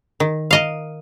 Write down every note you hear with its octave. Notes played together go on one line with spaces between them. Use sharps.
D#3
A#4 D#5 F5